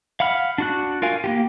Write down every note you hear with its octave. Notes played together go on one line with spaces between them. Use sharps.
F5 F#5 B5 F6
D4 F#4 F#6
F4 A#4 F5 G#5
A#3 F4 G4